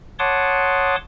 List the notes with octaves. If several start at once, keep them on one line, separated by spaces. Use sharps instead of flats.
C#5 F#5 A5 C6 D6 D#6